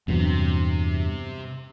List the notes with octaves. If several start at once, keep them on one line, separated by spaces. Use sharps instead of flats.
E2 G2 C3 F#3